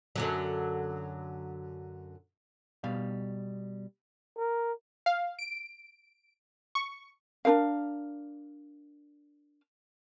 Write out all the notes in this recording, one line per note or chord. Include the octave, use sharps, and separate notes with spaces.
F#2 D3 F#3
B2 G3 F5
A#4
F5
D7
C#6
D4 D#4 A#4 F5